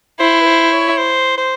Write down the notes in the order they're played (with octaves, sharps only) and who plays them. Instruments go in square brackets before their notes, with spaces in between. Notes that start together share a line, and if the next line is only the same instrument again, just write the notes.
[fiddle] E4 [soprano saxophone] C5
[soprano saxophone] B4
C5
C#5
C5
C5